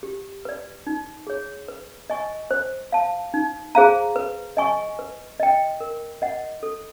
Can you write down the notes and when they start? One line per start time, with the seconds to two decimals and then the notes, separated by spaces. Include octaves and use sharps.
0.03 G4
0.45 B4 D5
0.87 D#4
1.27 G#4 C#5
1.68 B4
2.10 D#5 G#5 C#6
2.51 C5
2.92 F5 A5
3.34 D#4
3.75 G#4 C5 F5 A#5
4.16 B4
4.57 D#5 G#5 C#6
4.99 B4
5.40 D#5 G5
5.80 A#4
6.22 D#5 F#5
6.63 A4